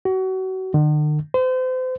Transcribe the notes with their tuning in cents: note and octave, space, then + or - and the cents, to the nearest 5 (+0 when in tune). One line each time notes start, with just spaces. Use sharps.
F#4 +30
D3 +45
C5 -35